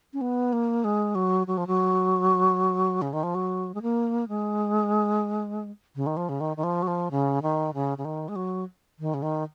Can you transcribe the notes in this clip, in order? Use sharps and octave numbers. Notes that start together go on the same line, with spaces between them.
C#4
B3
A#3
G#3
F#3
F#3
F3
F#3
C#3
D#3
F3
F#3
G#3
A#3
G#3
C#3
D#3
F3
C#3
D#3
D#3
F3
F#3
F3
C#3
D#3
C#3
C#3
D#3
G#3
F#3
D#3
C#3
D#3